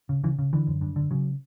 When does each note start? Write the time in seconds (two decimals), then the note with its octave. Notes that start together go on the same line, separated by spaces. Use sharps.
0.09 C#3
0.24 C#3 E3
0.39 C#3
0.53 D3 E3
0.67 F#2
0.81 G2
0.96 D3
1.11 C#3 F#3